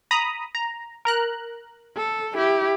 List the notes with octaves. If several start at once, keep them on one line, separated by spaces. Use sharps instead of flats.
A#5 B5 D#6
A#5
A#4 A#5 F#6
A4
E4 G4